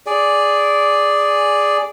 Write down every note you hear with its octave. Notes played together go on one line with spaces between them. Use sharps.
G#4 D5